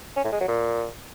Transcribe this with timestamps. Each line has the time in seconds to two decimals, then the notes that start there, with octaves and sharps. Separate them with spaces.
0.17 C#4
0.25 A2
0.32 G#3
0.40 F#3
0.48 A#2